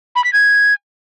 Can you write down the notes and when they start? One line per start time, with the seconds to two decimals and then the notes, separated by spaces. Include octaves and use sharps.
0.16 B5
0.24 B6
0.33 G#6